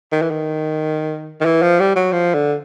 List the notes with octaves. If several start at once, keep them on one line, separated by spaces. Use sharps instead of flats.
D#3
E3
D#3
D#3
E3
F3
G3
F#3
F3
D3